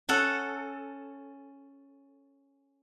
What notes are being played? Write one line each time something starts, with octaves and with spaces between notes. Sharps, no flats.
C#4 A4 F#5